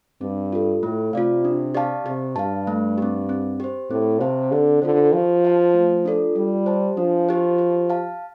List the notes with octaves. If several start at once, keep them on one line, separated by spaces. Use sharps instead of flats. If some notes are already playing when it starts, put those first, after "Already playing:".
G2 C4
F4 A4
A2 A3
C3 F4 D5 F5
D4
G4 D5 F5 A5
C3 G4
G2 F5 A5
A3
C4 G4
C4
G4 C5
A2 C4
C3 G4 C5 F5 A5
D3 C4
D3 F4 A4 C5
F3 G4
C5 F5 A5
A3
D4 F4 A4 D5
G3 F4
C5 A5
F3 D4
G4 C5
G4
F5 A5